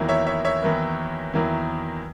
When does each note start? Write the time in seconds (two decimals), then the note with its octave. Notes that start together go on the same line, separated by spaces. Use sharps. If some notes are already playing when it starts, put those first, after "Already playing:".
Already playing: E2 D#3 F#3 A#3 E4
0.09 C#5 E5
0.27 C#5 E5
0.45 C#5 E5
0.62 E2 D#3 F#3 A#3 E4
1.33 E2 D#3 F#3 A#3 E4